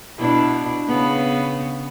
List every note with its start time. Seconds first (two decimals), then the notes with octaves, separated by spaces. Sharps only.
0.19 B2 D4 E4
0.88 C#3 B3